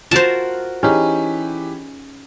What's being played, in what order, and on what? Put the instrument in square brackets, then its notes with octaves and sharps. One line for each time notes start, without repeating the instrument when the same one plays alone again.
[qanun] F4 F#4 A#4 [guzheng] C5 A5
[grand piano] E3 G4 [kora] C#4 D#4 G#4